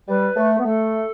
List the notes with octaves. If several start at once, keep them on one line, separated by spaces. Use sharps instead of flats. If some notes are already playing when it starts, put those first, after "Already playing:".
G3 B4
A3
B3
A3 A4